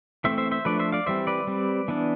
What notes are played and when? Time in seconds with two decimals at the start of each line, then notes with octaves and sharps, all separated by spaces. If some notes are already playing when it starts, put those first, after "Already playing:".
0.24 E3 A3 C4 C5 E5
0.38 C5 E5
0.51 C5 E5
0.65 F3 A3 D4 B4 D5
0.79 C5 E5
0.92 D5 F5
1.06 E3 G3 C4 C5 E5
1.27 B4 D5
1.47 G3 C4
1.88 E3 B3 D4